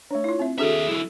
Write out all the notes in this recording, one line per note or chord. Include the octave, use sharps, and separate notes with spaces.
A3 D4 C#5
E4 F4
C4 E5
D#2 D4 F#4 G#4 A4 E5
F#3 E4